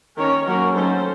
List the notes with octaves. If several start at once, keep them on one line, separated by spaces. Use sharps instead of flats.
D#3 A#3 C#4 A#4 C#5
F#3 A#3 C#4 F#4 A#4
D#3 F#3 A3 C#4 A4 C5